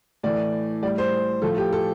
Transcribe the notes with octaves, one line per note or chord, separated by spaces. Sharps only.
A2 E3 A3 D5
A2 G3 D5
C5
A2 F3 A3 A4
G4
A4